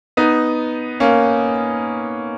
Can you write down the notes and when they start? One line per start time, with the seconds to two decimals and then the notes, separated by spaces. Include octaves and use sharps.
0.17 B3 D#4
1.00 A#3 C#4